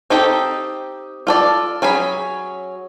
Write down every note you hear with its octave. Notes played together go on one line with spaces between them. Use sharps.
C4 D#4 G4 A4
F4 A4 D5
F#3 C#4 G#4 B5